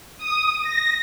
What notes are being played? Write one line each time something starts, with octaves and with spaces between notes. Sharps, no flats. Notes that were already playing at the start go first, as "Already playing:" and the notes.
D#6
A#6